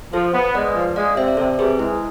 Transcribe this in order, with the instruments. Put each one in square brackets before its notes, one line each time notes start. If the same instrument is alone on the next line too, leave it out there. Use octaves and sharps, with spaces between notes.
[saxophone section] F3 [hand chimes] A4 C5
[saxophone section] B3
[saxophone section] G#3 [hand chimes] B4 D5
[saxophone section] F3
[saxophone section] G#3 [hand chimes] D5 F5
[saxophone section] C3 [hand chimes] C5 E5
[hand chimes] D5
[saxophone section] C3 [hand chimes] A4 C5
[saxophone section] C3 [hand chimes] G#4 B4
[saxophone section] G#3 [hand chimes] E4